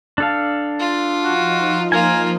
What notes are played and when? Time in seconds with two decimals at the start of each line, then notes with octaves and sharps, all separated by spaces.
0.18 D4 A4 F5
0.79 F4
1.24 F3 D#4 F#4
1.92 A#3 F4 A#4 G#5